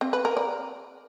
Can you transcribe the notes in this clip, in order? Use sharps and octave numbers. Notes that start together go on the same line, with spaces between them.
C4
B4
A#4
D5